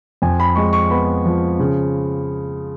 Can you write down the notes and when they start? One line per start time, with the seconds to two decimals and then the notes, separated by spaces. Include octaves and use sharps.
0.22 F2 G#5
0.40 B5
0.56 G#3 C#6
0.73 C#6
0.90 B3 B5
1.26 F3
1.59 C#3